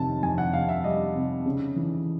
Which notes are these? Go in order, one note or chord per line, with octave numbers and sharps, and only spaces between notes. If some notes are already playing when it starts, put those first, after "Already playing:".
Already playing: F2 C3 D#3 A5
F2 G#5
F#5
C3 F5
E5
G3 D#5
C3
C#3
E3